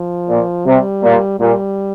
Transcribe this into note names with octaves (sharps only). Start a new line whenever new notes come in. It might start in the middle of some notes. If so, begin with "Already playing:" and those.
Already playing: F3
A#2
C3 G3
A#2
A#2 G3